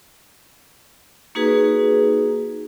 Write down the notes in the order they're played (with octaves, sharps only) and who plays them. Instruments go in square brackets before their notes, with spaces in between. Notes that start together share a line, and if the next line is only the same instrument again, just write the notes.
[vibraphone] A#3 D#4 F#4 G#4 B4